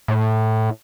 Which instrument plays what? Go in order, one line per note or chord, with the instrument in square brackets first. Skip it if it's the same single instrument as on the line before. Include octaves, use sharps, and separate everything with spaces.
[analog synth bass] A2